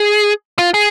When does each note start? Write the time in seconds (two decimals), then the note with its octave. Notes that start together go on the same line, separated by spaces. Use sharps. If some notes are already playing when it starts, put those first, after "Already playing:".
Already playing: G#4
0.59 F4
0.74 G#4